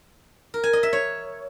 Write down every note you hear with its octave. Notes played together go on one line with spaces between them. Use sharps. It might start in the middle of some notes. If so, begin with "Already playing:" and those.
A#4
G#5
D#5
E5
C#5